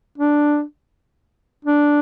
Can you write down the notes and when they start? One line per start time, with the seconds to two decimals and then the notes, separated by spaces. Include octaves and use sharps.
0.18 D4
1.65 D4